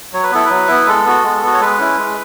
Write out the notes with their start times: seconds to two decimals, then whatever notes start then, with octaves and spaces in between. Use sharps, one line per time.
0.13 F#3 C#5
0.23 B4
0.32 B3 E4 A4
0.45 F#3 B4
0.68 B3 E4
0.86 G#3 A4
1.05 B3 F#4
1.24 G#3
1.42 B3 F#4
1.54 C#5
1.60 G#3 B4
1.78 C#4 E4
1.98 G#3